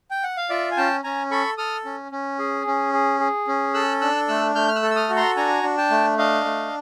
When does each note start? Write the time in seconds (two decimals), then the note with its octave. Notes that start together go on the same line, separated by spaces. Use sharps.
0.11 G5
0.24 F#5
0.37 F5
0.50 F4 D5 E5
0.71 G#5
0.77 C#4 G5 A5
1.03 C#4 G#5 A#5
1.31 A4 B5 C#6
1.58 A4 D#6 F6
1.85 C#4
2.12 C#4
2.39 G#4
2.67 C#4
2.93 G#4
3.20 G#4
3.48 C#4
3.74 A4 E6 F#6
4.01 D4 E6 F#6
4.28 A3 E6 F#6
4.55 A3 F6 G6
4.68 F6
4.75 E6 F#6
4.82 A4
4.91 E6
4.96 D#6 F6
5.09 F#4
5.16 A#5 C6
5.36 D4 G#5 A#5
5.63 D4
5.77 G5 A5
5.90 A3
6.18 D4 D#5 F5
6.45 A3